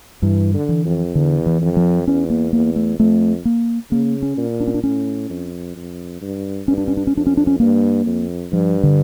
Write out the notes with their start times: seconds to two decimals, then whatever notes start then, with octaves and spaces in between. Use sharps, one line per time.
0.22 G2 E3
0.54 D3
0.69 E3
0.85 F2
1.15 E2 D3
1.46 E3
1.62 F2
1.77 F3
2.07 E2 C#4
2.30 A#3
2.53 E2 A#3
2.76 A3
2.99 F2 A3
3.45 A#3
3.91 C#3 A#3
4.22 C#4
4.37 A#2
4.60 D4
4.67 C#4
4.74 D4
4.83 A2 C#4
5.30 F2
5.76 F2
6.21 G2
6.68 G2 C#4
6.78 D4
6.88 C#4
6.97 D4
7.07 C#4
7.15 F2 D4
7.27 C#4
7.37 D4
7.47 C#4
7.60 G2 A#3
8.06 F2
8.52 G2 F3
8.83 D3